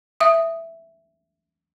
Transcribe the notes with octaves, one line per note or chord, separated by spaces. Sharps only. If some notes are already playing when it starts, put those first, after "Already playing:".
E5 D#6